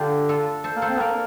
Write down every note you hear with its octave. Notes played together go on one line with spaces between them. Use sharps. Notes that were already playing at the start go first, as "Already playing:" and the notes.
Already playing: D3 D4 F4 G4
F4 A4
A4 C5
A#3
A4 C5
C4
A#3 A#4 D5